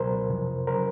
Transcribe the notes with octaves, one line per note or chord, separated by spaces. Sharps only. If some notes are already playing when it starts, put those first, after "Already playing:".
Already playing: C#2 B2 F#3 A#4 C5
F2 C3 F3
C#3 F#3 A#4 C5